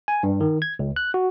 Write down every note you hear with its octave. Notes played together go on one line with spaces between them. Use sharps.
G#5
G2
D#3
G#6
C#2
F#6
F#4